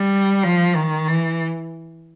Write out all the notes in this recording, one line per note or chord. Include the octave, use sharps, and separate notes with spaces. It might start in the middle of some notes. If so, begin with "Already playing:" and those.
Already playing: G3
F3
D#3
E3